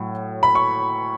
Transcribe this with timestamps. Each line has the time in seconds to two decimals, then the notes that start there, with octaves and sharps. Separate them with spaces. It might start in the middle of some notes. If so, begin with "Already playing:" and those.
Already playing: A2 F#3
0.43 B5
0.55 C#6